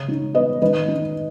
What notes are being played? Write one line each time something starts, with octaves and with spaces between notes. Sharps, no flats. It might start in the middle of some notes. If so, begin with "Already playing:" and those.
Already playing: C#3 C#5
D#4
B3 B4 D#5
D#3 B4 D#5
D#4